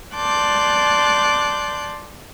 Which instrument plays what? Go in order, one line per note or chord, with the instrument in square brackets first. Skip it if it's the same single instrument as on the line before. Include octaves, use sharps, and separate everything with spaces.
[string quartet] D5 A5 C6 D6 F#6 G6